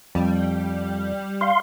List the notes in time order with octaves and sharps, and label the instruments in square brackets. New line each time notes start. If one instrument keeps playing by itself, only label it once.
[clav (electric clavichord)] F2 [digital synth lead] G3
[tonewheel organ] F5 C6